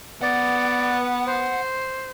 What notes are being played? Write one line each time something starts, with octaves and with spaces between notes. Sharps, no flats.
B3 D5 F#5
C5